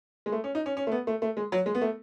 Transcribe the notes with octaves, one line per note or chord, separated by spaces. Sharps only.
G#3
A3
C#4
D#4
C#4
C#4
A3
B3
A3
A3
G#3
F#3
G#3
B3
A3